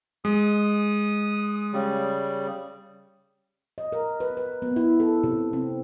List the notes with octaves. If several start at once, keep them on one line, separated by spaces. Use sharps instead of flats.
G#3 D#6
C#3 G3
D#5
A#4
B4
B4
B3
E4
A4
C3
C4